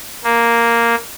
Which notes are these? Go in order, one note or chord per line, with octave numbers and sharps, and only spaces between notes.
A#3